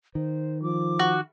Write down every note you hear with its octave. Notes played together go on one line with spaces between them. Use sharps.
D#3 C5
F3 D6
F#4